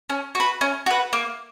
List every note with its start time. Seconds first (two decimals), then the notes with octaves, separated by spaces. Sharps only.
0.10 C#4
0.35 F#4 B4
0.61 C#4
0.86 F#4 B4
1.13 A#3